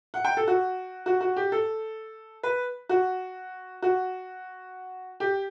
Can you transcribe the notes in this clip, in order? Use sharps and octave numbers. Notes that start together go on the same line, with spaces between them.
F#5
G5
A4
F#4
F#4
F#4
G4
A4
B4
F#4
F#4
G4